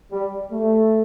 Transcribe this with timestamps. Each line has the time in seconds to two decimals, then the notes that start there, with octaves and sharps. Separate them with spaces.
0.11 G3
0.52 A3